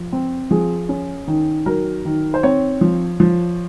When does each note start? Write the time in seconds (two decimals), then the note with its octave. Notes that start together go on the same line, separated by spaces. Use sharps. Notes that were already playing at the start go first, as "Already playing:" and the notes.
Already playing: F3
0.12 C4
0.51 F3 G#4
0.89 C#4
1.27 D#3
1.66 F#3 A#4
2.05 D#3
2.34 C5
2.43 C4 C#5
2.81 F3
3.20 F3